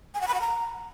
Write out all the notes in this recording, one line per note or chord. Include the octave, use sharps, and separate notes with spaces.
G#5
F#5
B5
F#5
A#5